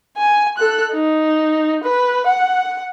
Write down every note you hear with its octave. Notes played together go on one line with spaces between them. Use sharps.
G#5
A4 F#6
D#4
B4
F#5